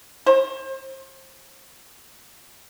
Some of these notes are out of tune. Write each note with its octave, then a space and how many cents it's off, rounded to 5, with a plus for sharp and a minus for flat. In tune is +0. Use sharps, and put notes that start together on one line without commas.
C5 +35